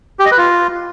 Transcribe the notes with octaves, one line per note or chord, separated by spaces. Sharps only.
G4
D#5
B4
F4